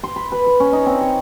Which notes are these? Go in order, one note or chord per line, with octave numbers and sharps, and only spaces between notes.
C6
B5
B4
C6
C#4
D#4
C4
C#5